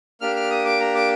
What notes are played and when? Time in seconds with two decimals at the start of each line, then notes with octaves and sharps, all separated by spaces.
0.21 A#3 D4 G4 F6
0.36 F6
0.51 D#6
0.65 D6
0.80 A#5
0.95 D6